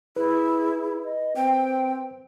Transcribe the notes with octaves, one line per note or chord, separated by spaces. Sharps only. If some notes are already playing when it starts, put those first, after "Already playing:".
E4 G#4 B4
D#5
C4 G5